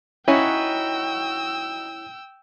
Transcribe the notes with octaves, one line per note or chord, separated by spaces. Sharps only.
C#4 D#4 E4 F#4 B4 G5 E6